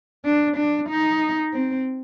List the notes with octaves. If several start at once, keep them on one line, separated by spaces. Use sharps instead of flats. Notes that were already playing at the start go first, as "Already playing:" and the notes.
D4
D4
D#4
C4